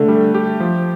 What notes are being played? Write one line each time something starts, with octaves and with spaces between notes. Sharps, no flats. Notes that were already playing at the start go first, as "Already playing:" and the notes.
Already playing: D3 A3
G3
G4
F3